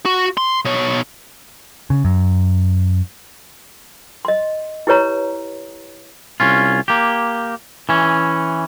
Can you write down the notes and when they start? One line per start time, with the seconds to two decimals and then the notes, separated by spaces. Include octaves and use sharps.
0.06 F#4
0.37 C6
0.65 B2 C#5
1.90 C#3
2.04 F#2
4.25 D#5 C6
4.87 E4 G4 B4 C#5 A#5
6.40 C2 C#4 F4
6.88 A#3 G4
7.89 E3 C#4